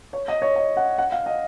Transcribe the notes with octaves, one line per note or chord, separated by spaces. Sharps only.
C#5
D#5
C#5
D#5
F#5
F#5
F5
D#5